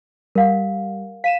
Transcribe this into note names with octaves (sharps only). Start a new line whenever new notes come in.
G3 A#4 F5 F#5
F5 B6 D#7 E7